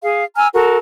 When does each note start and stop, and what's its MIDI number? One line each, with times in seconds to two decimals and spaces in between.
0.03 0.24 68
0.03 0.24 77
0.37 0.47 80
0.37 0.47 82
0.37 0.47 88
0.37 0.47 89
0.54 0.78 66
0.54 0.78 69
0.54 0.78 70